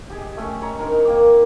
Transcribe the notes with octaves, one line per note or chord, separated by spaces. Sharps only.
G4 G#4 D#5
A3 C#4 G4
C#5 D#5 A#5
C4 D4 D#4 A#4
D#4
A#3 G5 D6